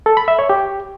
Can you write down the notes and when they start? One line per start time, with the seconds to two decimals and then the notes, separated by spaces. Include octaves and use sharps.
0.06 A4
0.17 B5
0.28 E5
0.39 C#5
0.50 G4